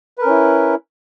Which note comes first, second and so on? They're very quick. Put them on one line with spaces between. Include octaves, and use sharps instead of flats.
B4 A#4 C#4 E4